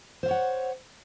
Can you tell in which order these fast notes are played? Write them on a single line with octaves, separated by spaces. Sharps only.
C5 F5 C#5 F#5